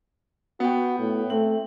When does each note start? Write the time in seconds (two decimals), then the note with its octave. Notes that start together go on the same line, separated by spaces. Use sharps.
0.60 B3 F#4 G5
0.99 A2
1.30 A3 C4 F#7